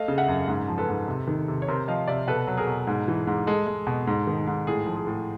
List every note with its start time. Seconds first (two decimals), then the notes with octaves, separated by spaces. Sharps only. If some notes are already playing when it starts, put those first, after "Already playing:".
Already playing: A3 D#5 F5
0.08 C#3
0.18 E5 F#5
0.28 F#2
0.48 G#2
0.68 F3
0.78 A4 B4
0.88 G#2
1.08 C3
1.27 D#3
1.48 C3
1.62 C#5
1.68 C3 A#4 C5
1.88 F3 D#5 F5
2.08 C3 D5 E5
2.27 B2 A4 B4
2.47 F#3
2.57 G#4 A#4
2.67 B2
2.87 G#2
3.08 E3
3.27 G#2
3.47 G#3 A4
3.67 G#3
3.87 B2
4.07 G#2
4.27 D#3
4.47 G#2
4.67 A2 G#4
4.86 F3
4.96 G#4
5.07 A2